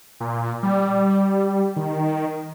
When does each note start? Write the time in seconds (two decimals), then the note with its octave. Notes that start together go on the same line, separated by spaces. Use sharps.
0.20 A#2
0.63 G3
1.76 D#3